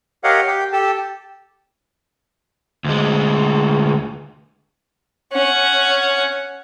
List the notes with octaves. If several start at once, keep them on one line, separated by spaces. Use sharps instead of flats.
G4 A#4 C#5 D#5 F5 F#5
G4 G5
G4 A4 G5 A5
D2 G#3
C#4 F#5